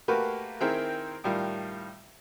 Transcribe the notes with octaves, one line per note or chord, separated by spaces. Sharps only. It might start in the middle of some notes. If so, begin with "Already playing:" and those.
A3 A#3 F#4 G4 A#4 B4
D#3 C4 E4 G#4 A#4 G5
A2 D#3 G3 F4